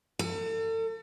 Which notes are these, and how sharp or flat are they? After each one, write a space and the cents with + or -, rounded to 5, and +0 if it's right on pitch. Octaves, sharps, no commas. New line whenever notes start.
A4 +40